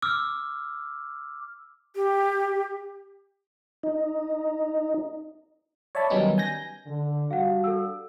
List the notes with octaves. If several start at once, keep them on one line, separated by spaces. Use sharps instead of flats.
D6 E6 F6
G4
D#4
C#5 D5 E5 A5 B5
D#3 F#3 G3 B3 C#4 D#4
G#5 G6 A#6
D3
G3 D4 F#4 F5 F#5
A4 E6